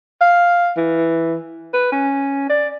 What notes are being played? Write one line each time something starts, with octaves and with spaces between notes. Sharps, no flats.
F5
E3
B4
C#4
D5